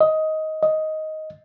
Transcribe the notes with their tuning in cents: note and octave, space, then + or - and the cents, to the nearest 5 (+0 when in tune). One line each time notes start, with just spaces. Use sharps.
D#5 +15
D#5 +10